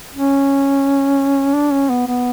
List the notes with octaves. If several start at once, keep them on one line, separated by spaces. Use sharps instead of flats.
C#4
D4
C#4
B3
B3